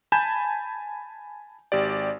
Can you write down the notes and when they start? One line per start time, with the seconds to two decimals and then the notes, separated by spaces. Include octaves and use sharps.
0.12 G#5 A5 B5 G6 E7
1.72 G#1 G4 D5